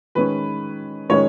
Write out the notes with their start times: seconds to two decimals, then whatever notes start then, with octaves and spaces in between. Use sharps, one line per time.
0.15 D#3 G#3 C#4 B4
1.09 D#3 G#3 C#4 C#5